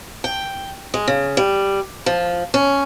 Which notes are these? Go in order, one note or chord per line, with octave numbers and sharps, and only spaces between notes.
G5
G#3
C#3
G3
F3
C#4